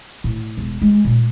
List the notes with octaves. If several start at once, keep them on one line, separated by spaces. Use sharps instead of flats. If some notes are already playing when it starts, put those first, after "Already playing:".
A2
E1
G#3
A#2